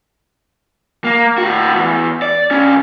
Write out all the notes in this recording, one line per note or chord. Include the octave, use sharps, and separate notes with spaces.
A#3
A2 F#4
E2
D5
D2 C#4